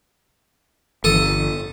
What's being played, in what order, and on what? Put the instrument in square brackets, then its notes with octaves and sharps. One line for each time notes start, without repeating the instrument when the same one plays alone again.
[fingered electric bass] G1 [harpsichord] A4 D#6